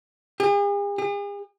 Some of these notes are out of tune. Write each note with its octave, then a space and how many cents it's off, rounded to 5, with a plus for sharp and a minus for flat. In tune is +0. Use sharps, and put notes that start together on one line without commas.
G#4 -45
G#4 -45